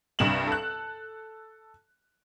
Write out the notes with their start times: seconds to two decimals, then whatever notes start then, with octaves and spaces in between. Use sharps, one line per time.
0.19 C2 G2 E7 F#7
0.47 A4 F#6